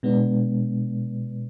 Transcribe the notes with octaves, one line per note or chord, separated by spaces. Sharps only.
B2 G#3 B3 D4